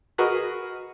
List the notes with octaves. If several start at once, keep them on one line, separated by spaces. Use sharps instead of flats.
F#4 G#4 A#4 B4 D#5